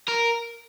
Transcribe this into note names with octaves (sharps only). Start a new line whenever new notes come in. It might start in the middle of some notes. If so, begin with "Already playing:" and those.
A#4